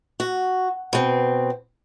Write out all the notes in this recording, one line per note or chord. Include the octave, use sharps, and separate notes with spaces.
F#4
B2 C4